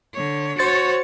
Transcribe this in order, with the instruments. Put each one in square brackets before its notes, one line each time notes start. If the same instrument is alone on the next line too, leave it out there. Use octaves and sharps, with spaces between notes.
[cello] D3 C#5
[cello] F#4 C#5 [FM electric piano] C5 A6 C#7